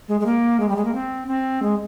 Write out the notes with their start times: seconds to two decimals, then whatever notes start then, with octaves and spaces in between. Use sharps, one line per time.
0.08 G#3
0.20 G#3
0.26 A#3
0.60 G#3
0.69 G3
0.76 G#3
0.85 A#3
0.95 C4
1.28 C4
1.62 G#3